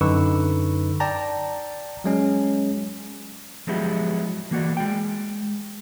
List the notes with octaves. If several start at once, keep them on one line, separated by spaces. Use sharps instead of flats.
F#2 D3 D#4 B4 C#6 E6
D5 G5 A5 A#5
F#3 G#3 C#4
F3 F#3 G#3 B3 E4 G4
E3 A#3 F#4 D5
G#3 G5